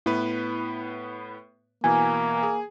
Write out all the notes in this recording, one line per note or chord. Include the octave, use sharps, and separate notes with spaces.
A2 B3 E4 B4
B2 E3 A#3 G#5
G#4